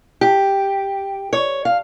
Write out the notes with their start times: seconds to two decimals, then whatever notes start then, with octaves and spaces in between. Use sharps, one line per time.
0.21 G4
1.33 C#5
1.65 F5